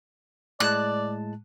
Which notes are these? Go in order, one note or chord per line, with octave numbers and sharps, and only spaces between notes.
A2 G#3 D5 A5 F#6